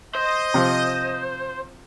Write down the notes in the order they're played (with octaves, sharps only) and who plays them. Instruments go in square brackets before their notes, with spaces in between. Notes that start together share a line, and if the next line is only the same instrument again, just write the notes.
[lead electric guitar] C5 [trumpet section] D#5
[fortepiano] C3 F3